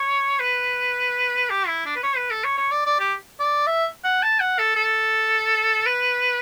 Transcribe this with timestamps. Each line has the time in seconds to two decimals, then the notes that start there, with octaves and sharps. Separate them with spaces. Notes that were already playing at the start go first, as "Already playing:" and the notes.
Already playing: C#5
0.40 B4
1.50 G4
1.67 E4
1.86 D4
1.96 B4
2.03 C#5
2.17 B4
2.31 A4
2.44 C#5
2.58 C#5
2.71 D5
2.86 D5
2.99 G4
3.39 D5
3.67 E5
4.04 F#5
4.22 A5
4.40 F#5
4.59 A4
4.76 A4
5.86 B4